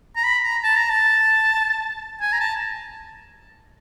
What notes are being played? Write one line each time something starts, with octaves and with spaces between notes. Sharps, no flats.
A#5
B5
A#5
A5
A#5
A5
G#5
A#5
A5